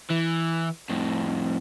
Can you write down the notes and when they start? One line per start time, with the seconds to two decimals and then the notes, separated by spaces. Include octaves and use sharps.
0.10 E3
0.89 F2 A2